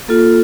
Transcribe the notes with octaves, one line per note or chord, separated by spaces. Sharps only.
A#3 F4 A4